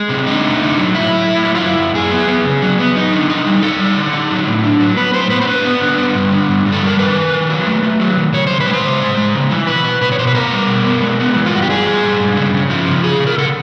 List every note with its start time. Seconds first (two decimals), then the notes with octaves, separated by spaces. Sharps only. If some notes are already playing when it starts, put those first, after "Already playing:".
Already playing: G#3
0.09 C3
0.27 D3 D#4
0.44 A3
0.60 D3
0.77 F#3
0.94 A3 E4
1.11 A3
1.27 A3
1.44 F#3
1.55 F4
1.60 F#2 E4
1.78 F#2
1.94 F#2 G#4
2.11 B3
2.28 B3
2.45 C#3
2.62 F#3
2.79 B3
2.96 D#4
3.13 D3
3.30 D#4
3.46 G3
3.62 G3 A4
3.79 D#4
3.97 D3
4.13 D#4
4.31 F#3
4.47 A2
4.64 D4
4.80 F#3
4.97 B3 B4
5.13 A2 C5
5.30 B3 B4
5.41 C5
5.47 D4 B4
5.65 B3
5.81 D3
5.97 B3
6.15 G2
6.32 D3
6.49 G2
6.65 G2
6.72 A4
6.83 G3 A#4
6.99 D#3 B4
7.16 D#3
7.33 D#3
7.50 F#3
7.67 A3
7.83 A3
8.00 F#3
8.17 D#3
8.33 C#3 C#5
8.47 C#3 C5
8.60 B4
8.66 G#3
8.73 C5
8.84 C#3
9.01 G#3
9.17 G#3
9.34 C#3
9.51 E3
9.67 B2 B4
9.84 B2
10.01 B2 B4
10.12 C#5
10.19 B2 C5
10.27 B4
10.34 B3 A#4
10.52 G3
10.69 B2
10.85 B3
11.02 G#3
11.20 B3
11.36 E3
11.46 F4
11.53 G2 F#4
11.62 G4
11.70 G2 G#4
11.86 G#3
12.03 G2
12.20 G2
12.37 C#3
12.53 C#3
12.70 F3
12.87 C#3
13.03 C#3 G#4
13.20 C#3
13.27 A#4
13.38 C#3 A4